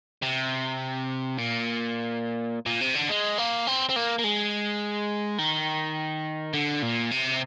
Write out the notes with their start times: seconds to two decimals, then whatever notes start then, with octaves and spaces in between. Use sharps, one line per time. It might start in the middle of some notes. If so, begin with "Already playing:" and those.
0.23 C3
1.38 A#2
2.66 A#2
2.81 C3
2.95 D3
3.09 G#3
3.38 A#3
3.67 C4
3.89 C4
3.96 A#3
4.19 A#3
4.24 G#3
5.39 D#3
6.53 D3
6.82 A#2
7.11 C3